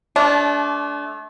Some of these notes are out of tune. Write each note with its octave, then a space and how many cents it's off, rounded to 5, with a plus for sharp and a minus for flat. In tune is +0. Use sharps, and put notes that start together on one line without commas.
A3 -35 D4 -20